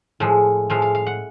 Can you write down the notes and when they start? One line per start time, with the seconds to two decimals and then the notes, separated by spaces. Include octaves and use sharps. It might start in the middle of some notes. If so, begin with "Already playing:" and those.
0.20 A2 F3 G#3
0.70 A2 F3 G#3 F5
0.82 F5
0.95 F5
1.07 F#5